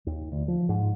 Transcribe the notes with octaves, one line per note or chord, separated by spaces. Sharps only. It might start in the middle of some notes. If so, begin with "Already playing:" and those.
D#2
D2
F3
G#2